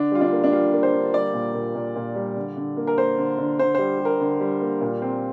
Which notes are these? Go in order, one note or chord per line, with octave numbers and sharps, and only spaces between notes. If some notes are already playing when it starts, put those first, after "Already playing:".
Already playing: D3 D4
G3 F4
D4
A#3
D4
G3 F4
A#3
C5
D3
G3 D5
A#2
A#2
A#2
A#2
G3
D3
D3
A#3
A#4
A#3 C5
D3
D3
D3 C5
G3 C5
G3
A#4
D3
G3
A#3
A#2
C4